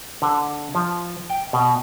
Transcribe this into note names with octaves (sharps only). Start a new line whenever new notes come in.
D3
F3
G5
B2